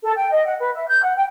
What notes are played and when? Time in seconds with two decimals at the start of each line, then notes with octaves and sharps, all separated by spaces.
0.03 A4
0.16 G5
0.31 D#5
0.45 F#5
0.59 B4
0.74 E5
0.87 G6
1.03 F#5
1.16 G5